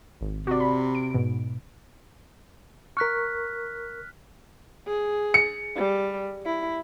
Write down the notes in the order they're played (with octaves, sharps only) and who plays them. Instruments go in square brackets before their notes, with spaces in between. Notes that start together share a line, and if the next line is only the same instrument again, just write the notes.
[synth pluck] G#1
[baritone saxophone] C3 [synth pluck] F#4 D5
[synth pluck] B5
D7
G#2 B2
[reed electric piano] A#4 C#6 [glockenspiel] F6 F#6 B6
[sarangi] G#4
[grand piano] C#7
[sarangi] G3
E4